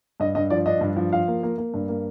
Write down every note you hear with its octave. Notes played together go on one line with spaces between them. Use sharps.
G2 D#5
G2 D#5
F3 D5
D4 D#5
G2
F3
F3 F5
A#3
A#3
A#3
G2
A#3